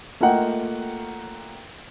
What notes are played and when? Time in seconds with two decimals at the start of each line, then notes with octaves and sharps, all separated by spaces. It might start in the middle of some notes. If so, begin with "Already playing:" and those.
0.20 A3 A#3 F4 D#5 F#5 G5